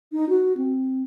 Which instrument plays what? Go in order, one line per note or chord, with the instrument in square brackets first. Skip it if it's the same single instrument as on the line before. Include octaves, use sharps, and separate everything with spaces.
[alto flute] D#4
F#4
C4